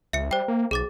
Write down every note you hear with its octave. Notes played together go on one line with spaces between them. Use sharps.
C#2 E5 C#7
G3 C5 G5
A#3
B1 G#4 D6 A6